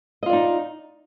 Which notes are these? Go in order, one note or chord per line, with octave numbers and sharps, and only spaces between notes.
D#4 F4 D5 D#5